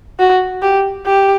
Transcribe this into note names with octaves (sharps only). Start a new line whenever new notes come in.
F#4
G4
G4